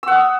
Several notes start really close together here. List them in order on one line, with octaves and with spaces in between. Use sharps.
E6 F#5 D#6